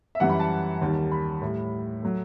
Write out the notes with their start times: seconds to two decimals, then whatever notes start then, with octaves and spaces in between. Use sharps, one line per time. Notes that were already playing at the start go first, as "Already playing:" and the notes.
0.15 E5
0.20 F#2 E3 G3 F#5
0.29 B5
0.40 A5
0.81 D#2 D#3 G3
1.12 B5
1.42 A2 G3
2.02 F#3 A3